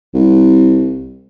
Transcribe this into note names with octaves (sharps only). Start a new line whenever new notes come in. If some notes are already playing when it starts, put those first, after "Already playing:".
C2